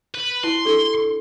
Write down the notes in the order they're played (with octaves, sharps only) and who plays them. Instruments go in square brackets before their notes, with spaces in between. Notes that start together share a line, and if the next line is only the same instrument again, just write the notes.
[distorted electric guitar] B4
[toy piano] E4 A5 [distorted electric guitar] C6
[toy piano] D4 G4 A4